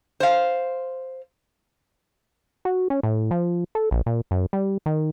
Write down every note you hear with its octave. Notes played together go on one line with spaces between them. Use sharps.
C5 F5
F#4
C#4
A2
F3
A4
A#1
A#2
F#2
G3
D#3